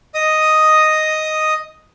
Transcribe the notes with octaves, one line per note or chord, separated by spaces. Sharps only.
D#5 D#6